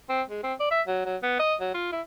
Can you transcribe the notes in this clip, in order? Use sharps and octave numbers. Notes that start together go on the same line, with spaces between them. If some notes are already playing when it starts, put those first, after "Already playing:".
C4
G#3
C4
D5
E5
F#3
F#3
B3
D#5
F#3
F4
E4